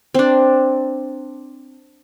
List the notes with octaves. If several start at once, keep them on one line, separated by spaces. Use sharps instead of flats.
C4 D4